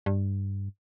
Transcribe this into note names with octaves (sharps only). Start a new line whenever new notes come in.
G2